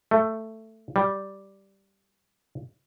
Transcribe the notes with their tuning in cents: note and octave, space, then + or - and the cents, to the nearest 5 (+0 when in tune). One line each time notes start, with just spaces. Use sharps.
A3 +10
G3 -5